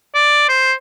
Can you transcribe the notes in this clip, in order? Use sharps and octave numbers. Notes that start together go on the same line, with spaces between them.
D5
C5